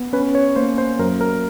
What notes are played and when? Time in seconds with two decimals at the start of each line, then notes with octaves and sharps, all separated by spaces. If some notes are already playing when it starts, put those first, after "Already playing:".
Already playing: B3
0.13 C#4 B4
0.35 C#5
0.56 A#3 C5
0.78 C5
0.99 F#2 A#4
1.21 A#4